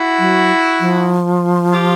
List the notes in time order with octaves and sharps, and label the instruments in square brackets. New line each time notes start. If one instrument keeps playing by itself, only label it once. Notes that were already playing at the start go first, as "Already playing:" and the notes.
Already playing: [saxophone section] E4 F#4
[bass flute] F#3
F3
[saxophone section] F4 G4